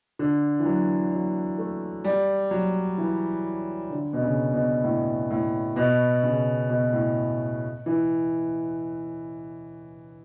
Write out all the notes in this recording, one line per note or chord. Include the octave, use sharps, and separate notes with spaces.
D3
E3
F#3
F#3
A3
G3
F#3
E3
D3
B2
C#3
B2
A2
A2
B2
C#3
B2
A2
E3